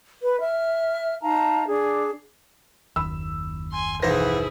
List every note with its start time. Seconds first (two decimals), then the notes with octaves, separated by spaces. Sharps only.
0.23 B4
0.42 E5 F6
1.22 D#4 F5 A5 A#5
1.67 D4 G#4
2.96 F#1 D#2 B5 E6
3.71 G#5 C6
4.03 B1 E3 B3 E4 G#4 C5 A#6